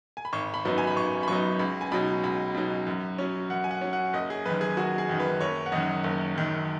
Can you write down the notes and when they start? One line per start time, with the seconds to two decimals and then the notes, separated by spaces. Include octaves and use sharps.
0.17 G#5
0.25 B5
0.33 G#1 C#6
0.54 B5
0.65 F#2 F#3 B3 D#4
0.78 G#5
0.87 B5
0.96 G#1 C#6
1.23 B5
1.28 F#2 F#3 B3 D#4 C#6
1.59 C#2 B5
1.81 G#5
1.92 B2 F#3 D#4 B5
2.24 C#2 B5
2.54 B2 F#3 D#4
2.87 F#2
3.19 F#3 C#4
3.50 F#2 F#5
3.64 G#5
3.71 F#5
3.81 F#3 C#4
3.93 F#5
4.13 F#1 D#5
4.30 G#4
4.45 F#2 D#3 B4
4.61 G#4
4.77 F#1 F#4
4.98 G#4
5.09 F#2 D#3
5.20 B4
5.40 F#1 C#5
5.66 F#5
5.72 F#2 D#3 D#5
6.04 F#1
6.35 F#2 D#3